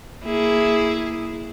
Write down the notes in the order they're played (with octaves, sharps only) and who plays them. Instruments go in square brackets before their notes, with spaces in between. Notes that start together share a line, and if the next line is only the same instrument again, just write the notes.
[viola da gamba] A#3 E4 G#4